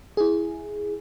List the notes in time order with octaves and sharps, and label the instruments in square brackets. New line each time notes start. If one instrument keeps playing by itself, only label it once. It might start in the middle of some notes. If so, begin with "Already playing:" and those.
[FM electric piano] E4 G#4